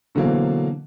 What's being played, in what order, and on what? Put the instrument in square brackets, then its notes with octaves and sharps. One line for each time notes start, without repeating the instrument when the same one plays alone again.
[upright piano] B2 D3 E3 F#3 A#3 C4